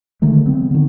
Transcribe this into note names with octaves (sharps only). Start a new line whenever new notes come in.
D3 D#3 G#3 A3
C#3 F#3 B3 C4
D3 D#3